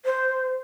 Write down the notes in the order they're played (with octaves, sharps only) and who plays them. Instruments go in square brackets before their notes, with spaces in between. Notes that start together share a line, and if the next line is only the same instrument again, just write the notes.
[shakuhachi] C5